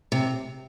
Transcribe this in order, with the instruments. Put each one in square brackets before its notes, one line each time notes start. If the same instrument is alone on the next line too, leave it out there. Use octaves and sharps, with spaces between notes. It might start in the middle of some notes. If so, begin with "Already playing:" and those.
[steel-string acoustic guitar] C3